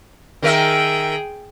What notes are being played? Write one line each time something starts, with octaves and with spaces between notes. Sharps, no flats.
D#3 G#4 A#4 E5 G5